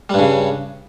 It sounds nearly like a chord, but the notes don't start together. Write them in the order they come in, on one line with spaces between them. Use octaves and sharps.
G3 G2 C#3